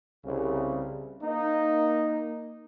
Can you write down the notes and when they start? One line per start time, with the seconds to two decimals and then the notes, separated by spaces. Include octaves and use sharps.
0.25 C2 C#3
1.23 A#3 D#4